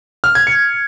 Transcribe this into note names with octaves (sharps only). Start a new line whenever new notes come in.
F6
G#6
C#7